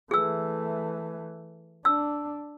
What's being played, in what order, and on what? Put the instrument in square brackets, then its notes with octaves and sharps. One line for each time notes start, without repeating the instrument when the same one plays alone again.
[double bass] E3 A3 [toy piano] G#4 E6
[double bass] D4 [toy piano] E6